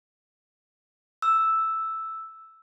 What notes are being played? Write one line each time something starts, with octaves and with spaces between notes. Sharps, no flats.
E6